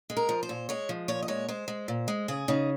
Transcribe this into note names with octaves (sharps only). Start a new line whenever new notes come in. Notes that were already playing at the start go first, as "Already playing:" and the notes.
G#3
A#4
F3
C5
A#2
G#3 C#5
F3
A#2 C#5
D#5
G#3 C#5
G#3 C5
G#3
A#2
G#3
C#3 G#4
C#3 D#4